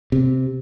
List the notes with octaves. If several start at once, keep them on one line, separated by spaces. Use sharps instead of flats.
C3